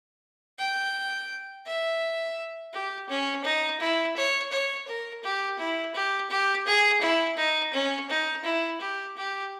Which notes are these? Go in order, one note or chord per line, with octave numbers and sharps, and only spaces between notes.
G5
E5
G4
C#4
D#4
E4
C#5
C#5
A#4
G4
E4
G4
G4
G#4
E4
D#4
C#4
D#4
E4
G4
G4